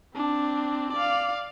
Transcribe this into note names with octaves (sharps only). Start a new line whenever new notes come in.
C4 D4
D5 F5